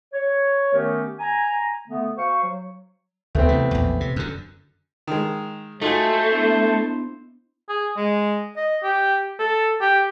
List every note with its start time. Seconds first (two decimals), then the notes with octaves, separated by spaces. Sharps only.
0.13 C#5
0.73 D#3 A3 B3 C#4 G4 A#4
1.19 G#5 A#5
1.88 D3 A3 B3
2.17 F#4 C5 F5 C#6
2.43 F#3
3.35 D2 A3 B3 C4
3.49 C3 E3
3.71 A#1 E2
4.00 C3
4.16 F#2 D3
5.07 D#3 G#3
5.81 A3 D#4 F4 F#4 C5 G#5
6.32 B3 D4 E4
7.69 G#4
7.97 G#3
8.57 D#5
8.84 G4
9.39 A4
9.81 G4